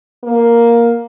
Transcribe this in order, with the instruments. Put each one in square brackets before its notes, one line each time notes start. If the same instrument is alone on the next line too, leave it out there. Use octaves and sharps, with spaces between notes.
[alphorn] A#3